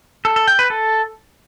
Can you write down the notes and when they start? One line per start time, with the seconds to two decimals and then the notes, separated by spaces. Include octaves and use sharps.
0.25 A4
0.36 A4
0.47 G5
0.59 B4
0.70 A4